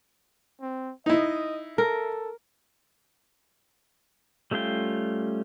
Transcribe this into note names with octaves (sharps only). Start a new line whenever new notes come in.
C4
D#4 E4 D#5
A4 A#4
G3 A3 C#4 F4 G5